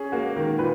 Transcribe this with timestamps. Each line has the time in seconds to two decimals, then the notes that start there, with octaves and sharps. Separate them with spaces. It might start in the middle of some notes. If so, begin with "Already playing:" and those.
Already playing: C#4 G#4
0.12 A#3 F#4
0.36 D#3 A#4
0.59 A#2 B4